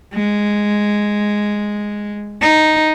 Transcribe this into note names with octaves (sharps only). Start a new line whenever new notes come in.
G#3
D#4